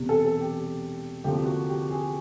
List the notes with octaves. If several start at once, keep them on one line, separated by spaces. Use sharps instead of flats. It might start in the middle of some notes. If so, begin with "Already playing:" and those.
Already playing: E1 E2 C3
A4
A4
G4
D2 C3 F3 A#3 G4
F#4
G4
G#4